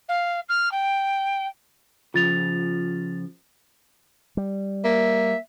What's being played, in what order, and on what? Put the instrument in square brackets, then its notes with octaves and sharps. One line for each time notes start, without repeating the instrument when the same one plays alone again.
[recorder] F5
F6
G5
[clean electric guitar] C#3 F3 [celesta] F4 A6 F7
[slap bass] G3
[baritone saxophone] A#3 [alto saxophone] E5